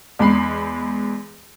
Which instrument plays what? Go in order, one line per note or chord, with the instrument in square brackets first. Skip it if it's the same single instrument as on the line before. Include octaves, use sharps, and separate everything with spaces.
[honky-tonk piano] E2 G#3 B5 C7